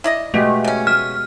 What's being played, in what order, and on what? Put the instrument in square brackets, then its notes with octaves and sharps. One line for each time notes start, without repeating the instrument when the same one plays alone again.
[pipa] E4 D5 D#5
[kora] B2 G#3 G4 [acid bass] A3
[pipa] C#3 C#4
[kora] E5 [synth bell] F6